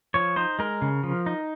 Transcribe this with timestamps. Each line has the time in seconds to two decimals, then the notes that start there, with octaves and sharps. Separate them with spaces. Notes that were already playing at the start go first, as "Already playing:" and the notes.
0.14 F3 C#5
0.36 D#4 C5
0.59 G#3 A#4
0.82 C#3
1.03 F3
1.26 D#4